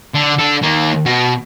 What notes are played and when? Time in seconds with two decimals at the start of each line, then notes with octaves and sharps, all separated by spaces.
0.14 D3
0.39 D4 A4
0.63 D#3 A#3
1.06 B2